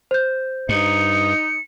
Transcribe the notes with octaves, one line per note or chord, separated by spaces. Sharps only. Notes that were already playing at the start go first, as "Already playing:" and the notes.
C5 G6
G2 D#4 C#7